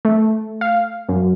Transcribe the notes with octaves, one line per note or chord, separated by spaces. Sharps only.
A3
F5
F#2